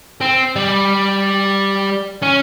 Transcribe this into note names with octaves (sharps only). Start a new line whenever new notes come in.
C4
G3
C#4